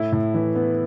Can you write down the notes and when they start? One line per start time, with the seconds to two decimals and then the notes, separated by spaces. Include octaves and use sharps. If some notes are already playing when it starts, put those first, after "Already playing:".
Already playing: A2 A3 E4
0.12 A2
0.34 E3
0.55 B3